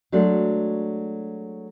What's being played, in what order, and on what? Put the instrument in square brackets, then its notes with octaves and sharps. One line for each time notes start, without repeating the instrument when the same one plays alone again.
[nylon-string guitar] F#3 G#3 A3 D4 F#4